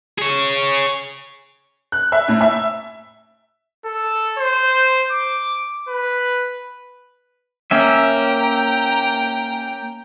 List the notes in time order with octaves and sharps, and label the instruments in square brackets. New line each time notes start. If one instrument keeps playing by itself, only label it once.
[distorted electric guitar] G#4 C#5
[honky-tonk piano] F#6
E5
A2
E5
[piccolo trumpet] A4
C5
D6
B4
[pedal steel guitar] A#3 C#4 E5 [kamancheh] G5 A#5